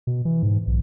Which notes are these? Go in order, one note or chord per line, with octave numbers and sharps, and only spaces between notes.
B2
E3
G#2
B1